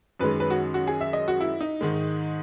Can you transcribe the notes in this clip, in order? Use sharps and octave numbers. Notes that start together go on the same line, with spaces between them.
F#2 D#3 G#3 B4
B4
F#4
F#4
G#4
E5
D#5
F#4
E4
D#4
G#2 D#3 G#3